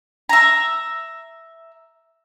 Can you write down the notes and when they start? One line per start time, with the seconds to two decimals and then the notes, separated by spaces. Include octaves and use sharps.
0.29 E5 A#5